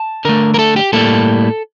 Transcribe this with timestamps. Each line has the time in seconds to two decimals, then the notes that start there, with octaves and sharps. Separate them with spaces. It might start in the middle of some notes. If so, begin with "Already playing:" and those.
Already playing: A5
0.25 D3 A3 A#4
0.54 A#4
0.59 A4
0.76 G4
0.93 A2 G3 A#3 A4